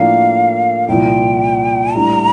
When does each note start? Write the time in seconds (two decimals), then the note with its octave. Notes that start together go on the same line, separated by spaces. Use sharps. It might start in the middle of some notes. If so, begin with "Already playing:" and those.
Already playing: A2 F3 A#3 D4 F5
0.88 C2 A#2 F3 G5
1.95 A2 G3 D4 A#5